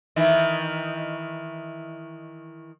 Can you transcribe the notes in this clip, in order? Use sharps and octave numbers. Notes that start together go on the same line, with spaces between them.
D#3 E3 E4